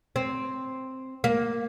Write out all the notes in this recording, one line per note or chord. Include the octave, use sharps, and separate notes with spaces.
C4
A#3